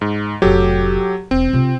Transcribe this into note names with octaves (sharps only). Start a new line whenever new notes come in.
G#2
F1 A2 F#3 G4 A4
E1 C4
C3 F4